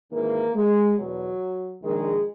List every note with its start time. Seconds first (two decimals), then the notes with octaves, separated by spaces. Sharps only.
0.11 G#1 G#2 E3 A#3
0.54 G#3
0.96 E2 B2 F#3
1.82 A#1 G#2 D#3 G#3